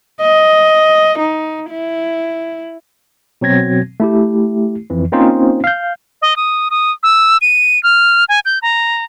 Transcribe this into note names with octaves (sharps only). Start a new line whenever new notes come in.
D#5
D#4
E4
B2 F#3 C4 G#6 A#6
A3 E4 G4
F2 E3
A#3 C4 C#4 D#4 F4 C5
F5 G6
D#5
D#6
D#6
E6
D#7
F6
G#5
G6
A#5